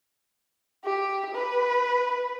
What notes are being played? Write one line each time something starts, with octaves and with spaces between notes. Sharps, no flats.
G4
B4